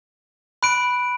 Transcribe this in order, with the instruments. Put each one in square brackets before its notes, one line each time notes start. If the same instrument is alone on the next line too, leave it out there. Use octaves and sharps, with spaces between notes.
[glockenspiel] B5 F#6 D7